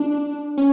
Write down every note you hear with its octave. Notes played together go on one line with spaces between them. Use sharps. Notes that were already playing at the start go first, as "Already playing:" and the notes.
Already playing: D4
C#4